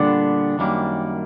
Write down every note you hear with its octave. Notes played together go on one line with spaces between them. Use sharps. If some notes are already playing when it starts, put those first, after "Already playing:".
Already playing: A#2 D3 G3 B3 D4
F#2 D#3 G3 A#3